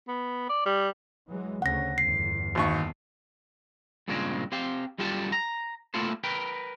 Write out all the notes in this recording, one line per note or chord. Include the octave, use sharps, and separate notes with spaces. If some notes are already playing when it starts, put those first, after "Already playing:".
B3
D5
G3
E3 F#3 G#3
D2 C#3 C#4 F#5 A#6
G1 E2 C7
G#1 D#2 C#6
G2 A#2 C#3 F3 G#3 C4
C4 G4 F5 G5
F#2 G3 F4 G4 A4 A5
A#5
A3 A#3 E4 F4 A4 C5
A#4 B4 G5